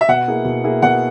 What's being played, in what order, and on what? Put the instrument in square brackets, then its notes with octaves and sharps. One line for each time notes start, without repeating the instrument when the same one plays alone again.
[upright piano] E5
[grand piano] B2 [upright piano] F#5
[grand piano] A#3 E4 G#4
B2
A#3 E4 G#4
[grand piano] B2 [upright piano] F#5